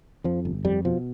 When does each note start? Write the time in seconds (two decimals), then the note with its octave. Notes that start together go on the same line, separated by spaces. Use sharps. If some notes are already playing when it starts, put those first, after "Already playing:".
0.24 F2 F3
0.45 G1
0.64 F2 G3
0.85 B2 F3